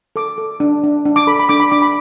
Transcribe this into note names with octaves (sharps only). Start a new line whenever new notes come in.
A4 D6
A4
D4
D4
D4
D6
A4 B5
B5
D4 D6
B5
D4 D6
B5